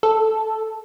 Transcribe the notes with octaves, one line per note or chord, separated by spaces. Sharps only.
A4